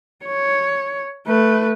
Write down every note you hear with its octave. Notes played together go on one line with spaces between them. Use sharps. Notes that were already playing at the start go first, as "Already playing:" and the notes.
C#5
A3 B4